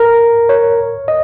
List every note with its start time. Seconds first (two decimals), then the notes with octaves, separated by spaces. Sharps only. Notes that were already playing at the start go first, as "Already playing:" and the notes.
Already playing: A#4
0.49 C#5
1.08 D#5